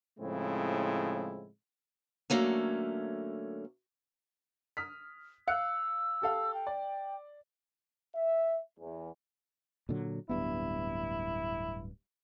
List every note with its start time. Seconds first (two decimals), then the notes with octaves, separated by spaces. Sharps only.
0.19 A2 C#3 F3 G#3 C4 E4
2.30 D3 F#3 A3 A#3 C#4
4.77 D#6 F6 B6
5.48 F5 E6 F#6 C#7
6.22 G4 A4 F5
6.54 G5
6.67 D5
8.15 E5
8.80 E2
9.89 A#2 D3 F#3
10.29 D1 G2 B3 E4